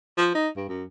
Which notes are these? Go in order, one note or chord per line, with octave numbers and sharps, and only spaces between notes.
F3
D#4
G2
F#2